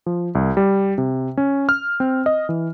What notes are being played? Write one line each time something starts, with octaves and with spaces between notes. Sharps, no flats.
F3
C2
G3
C3
C#4
F6
C4
D#5
E3